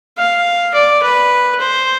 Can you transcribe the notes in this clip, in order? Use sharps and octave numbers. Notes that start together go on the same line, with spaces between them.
F5
D5
B4
C5